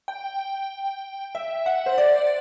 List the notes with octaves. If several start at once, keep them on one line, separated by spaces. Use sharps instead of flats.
G5
E5
F#5
C5
D5